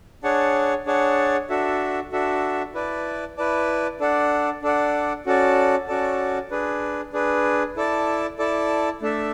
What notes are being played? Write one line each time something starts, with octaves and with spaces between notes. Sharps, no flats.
D4 G#4 C#5 F#5 A5
D4 G#4 C#5 F#5 A5
D4 F#4 A4 E5
D4 F#4 A4 E5
E4 B4 D5 A5
E4 B4 D5 A5
D4 A4 D5 F#5
D4 A4 D5 F#5
C#4 F#4 A4 D5 A5
C#4 F#4 A4 D5 A5
D4 G#4 B4
D4 G#4 B4
E4 A4 D5 A5
E4 A4 D5 A5
A3 D4 A4 E5